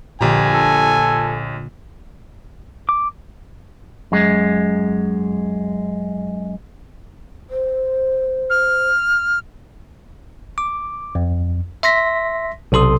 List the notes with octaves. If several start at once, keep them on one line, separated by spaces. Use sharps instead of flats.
A#1 A#2 D3 G4 G#5 A#5
A4
D6
F#2 G#3
C5
F6
D6
F2
E5 C6 A#6 B6
B1 C3 A4 C6 D#6